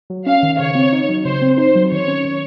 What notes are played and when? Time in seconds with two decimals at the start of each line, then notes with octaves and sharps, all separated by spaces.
0.10 F#3
0.26 C#4 F5
0.43 D#3
0.59 C#3 C#5
0.75 C4
0.93 D#4
1.09 F#3
1.25 C#3 C5
1.42 C4
1.58 D#4 C5
1.75 F#3
1.92 D#3 C#5
2.08 C#4
2.25 D#3